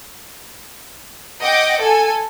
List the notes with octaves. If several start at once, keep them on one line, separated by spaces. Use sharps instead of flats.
D#5 F#5 G5 D6
A4 G#5